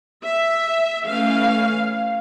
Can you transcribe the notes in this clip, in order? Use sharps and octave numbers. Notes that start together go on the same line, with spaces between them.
E5
E3 A3 C#4 F5